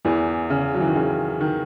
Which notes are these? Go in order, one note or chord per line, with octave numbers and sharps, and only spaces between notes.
E2 E3
C#3
F#3
E3
D#3
C#3
D#3